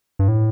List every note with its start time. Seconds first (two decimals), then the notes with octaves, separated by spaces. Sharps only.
0.19 G2
0.28 A2